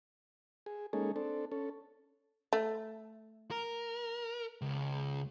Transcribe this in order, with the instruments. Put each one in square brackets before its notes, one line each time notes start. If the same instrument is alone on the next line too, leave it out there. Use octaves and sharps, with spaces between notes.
[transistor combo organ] G#4
G#3 A#3 C#4 D#4 G#4 A4
C4 D4 A4
C#4 A4
[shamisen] A3
[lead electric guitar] A#4
C#2